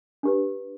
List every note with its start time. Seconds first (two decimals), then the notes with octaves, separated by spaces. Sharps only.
0.23 D4 G4 B4